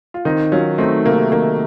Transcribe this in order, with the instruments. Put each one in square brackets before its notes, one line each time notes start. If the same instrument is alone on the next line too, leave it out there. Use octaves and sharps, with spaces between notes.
[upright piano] F4
[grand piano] D#3 [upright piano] C4 D#4
[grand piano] F#3 [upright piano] C#4 F4
[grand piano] A3 [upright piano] C4 D#4
[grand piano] C3 [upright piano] A#3
[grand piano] D#3 [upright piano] A#3